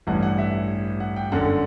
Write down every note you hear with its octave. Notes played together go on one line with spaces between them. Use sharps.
A1 G2 E3 F#5
F#5
E5
F#5
G5
G1 F#2 D3 F#5